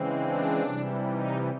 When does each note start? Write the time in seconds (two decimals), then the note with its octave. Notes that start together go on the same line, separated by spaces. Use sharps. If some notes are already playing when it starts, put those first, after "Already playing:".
Already playing: C#3 E3 G#3 C4
0.20 D4
0.63 C3 E3 G3
1.07 D#4